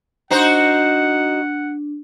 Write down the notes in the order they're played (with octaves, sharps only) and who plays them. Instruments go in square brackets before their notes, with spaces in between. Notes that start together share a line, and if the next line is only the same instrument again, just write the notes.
[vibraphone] D4 [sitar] D#4 F#4 C5 [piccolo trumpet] F#5